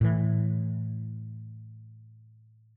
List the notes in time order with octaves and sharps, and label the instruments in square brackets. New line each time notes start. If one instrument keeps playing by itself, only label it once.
[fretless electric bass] A2 E3